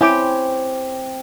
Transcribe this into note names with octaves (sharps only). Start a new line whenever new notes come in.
C4 C#4 E4 G4 C#5 D6